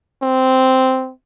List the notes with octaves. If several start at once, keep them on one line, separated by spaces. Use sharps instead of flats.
C4